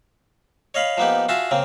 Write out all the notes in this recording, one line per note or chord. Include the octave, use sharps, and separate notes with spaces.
C#5 D#5 F5 B5
F3 A#3 B3 D#4 G4
F4 F#4 G#4 E5 A5
C#3 A#3 C4